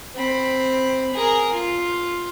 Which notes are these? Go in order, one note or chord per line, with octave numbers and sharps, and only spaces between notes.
C4 B5
G#4 A#4
F4